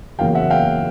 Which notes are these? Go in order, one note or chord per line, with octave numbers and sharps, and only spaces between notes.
F#1 E2 C#3 F#3 A#3 F5 G5
E5 F#5
F5 G5